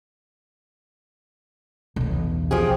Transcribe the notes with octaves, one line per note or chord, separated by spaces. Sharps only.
B1 E2
F3 G4 G#4